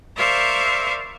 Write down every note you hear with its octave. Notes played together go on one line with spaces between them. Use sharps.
A#4 C5 D5 E5 F5 C#6